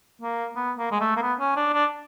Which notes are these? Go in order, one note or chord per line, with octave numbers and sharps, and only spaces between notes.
A#3
B3
A#3
G#3
A3
A#3
B3
C#4
D4
D4